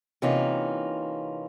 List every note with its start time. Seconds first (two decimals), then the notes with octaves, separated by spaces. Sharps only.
0.22 C3 E3 A#3 C#4 D#4 F4